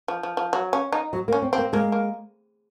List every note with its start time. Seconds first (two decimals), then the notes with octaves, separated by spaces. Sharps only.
0.08 F3
0.23 F3
0.37 F3
0.53 F#3
0.73 C#4
0.92 D#4
1.13 F#3
1.28 A#3
1.33 C#4
1.42 C4
1.53 C4
1.58 A#3
1.73 G#3 A#3
1.92 A#3